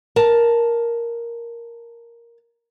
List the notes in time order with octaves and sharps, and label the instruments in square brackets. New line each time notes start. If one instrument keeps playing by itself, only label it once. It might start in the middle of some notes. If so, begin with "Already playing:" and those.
[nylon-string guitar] A#4 A5